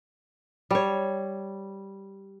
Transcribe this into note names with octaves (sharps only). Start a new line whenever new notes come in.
G3 C#5